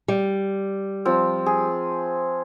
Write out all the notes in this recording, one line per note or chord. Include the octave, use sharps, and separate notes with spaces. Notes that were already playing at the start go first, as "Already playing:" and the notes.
G3
F3 C4
G#4